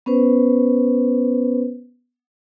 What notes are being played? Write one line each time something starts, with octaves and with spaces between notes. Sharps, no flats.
B3 C#4 B4 C5